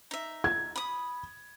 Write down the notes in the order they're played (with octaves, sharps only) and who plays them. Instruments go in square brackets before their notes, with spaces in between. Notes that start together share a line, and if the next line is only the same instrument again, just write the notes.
[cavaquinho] D#4 E5
[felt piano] G#6
[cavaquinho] B5 D#6